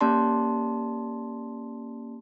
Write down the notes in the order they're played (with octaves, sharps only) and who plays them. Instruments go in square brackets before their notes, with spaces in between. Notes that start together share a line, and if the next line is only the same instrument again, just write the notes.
[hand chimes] A#3 C#4 G4 D5 A5 C6